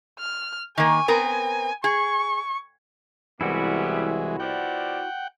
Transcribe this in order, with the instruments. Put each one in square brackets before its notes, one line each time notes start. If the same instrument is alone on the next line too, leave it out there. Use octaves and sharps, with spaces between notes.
[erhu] F6
[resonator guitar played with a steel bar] D#3 A#3 [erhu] G#5
[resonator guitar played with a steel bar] B3 C4 A#4
[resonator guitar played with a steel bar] G#4 [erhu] C#6
[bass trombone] C2 [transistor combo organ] E3 G#3 [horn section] G3 B3 [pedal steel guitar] E4 F#4
[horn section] B2 F3 D5 [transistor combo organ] F#5 G5